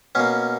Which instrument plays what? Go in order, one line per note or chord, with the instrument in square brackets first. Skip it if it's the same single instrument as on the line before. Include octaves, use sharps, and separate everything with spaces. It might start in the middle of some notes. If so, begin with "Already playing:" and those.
[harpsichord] B2 A#3 C#4